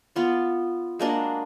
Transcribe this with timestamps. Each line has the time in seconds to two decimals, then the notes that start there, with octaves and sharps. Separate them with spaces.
0.16 B3 F4 D5
0.99 G#3 A#3 D4 F#4